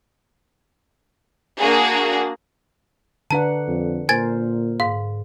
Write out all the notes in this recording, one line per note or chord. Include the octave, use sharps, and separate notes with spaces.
A#3 D4 F#4 G#4
D3 D4 B4 F#5 A5 A#5
F2
A#2 A#4 C5 G#5 G#6 A6
G#2 F5